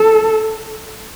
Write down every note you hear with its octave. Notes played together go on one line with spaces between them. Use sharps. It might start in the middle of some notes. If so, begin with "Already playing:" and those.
Already playing: A4